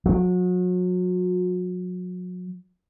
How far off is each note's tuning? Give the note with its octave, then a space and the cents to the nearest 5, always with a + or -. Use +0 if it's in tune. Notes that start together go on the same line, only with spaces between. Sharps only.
F#3 -35